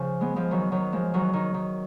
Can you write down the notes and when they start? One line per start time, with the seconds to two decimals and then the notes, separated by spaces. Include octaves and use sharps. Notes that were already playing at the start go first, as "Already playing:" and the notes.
Already playing: C#3 F3
0.21 G#3 B3
0.36 F3 G#3
0.51 D#3 F#3
0.72 D#3 F#3
0.92 F3 G#3
1.14 D#3 F#3
1.33 D#3
1.54 D#3